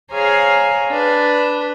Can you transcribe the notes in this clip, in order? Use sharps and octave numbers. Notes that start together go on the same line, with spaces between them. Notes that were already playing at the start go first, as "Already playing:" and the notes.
G#4 C5 C#5 F5 G#5 A#5
D4 B4